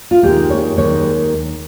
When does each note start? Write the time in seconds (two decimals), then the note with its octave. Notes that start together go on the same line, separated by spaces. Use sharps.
0.11 F4
0.23 D#2 D#3 G#3 G4
0.50 C#5
0.77 D#2 D#3 G#3 C#5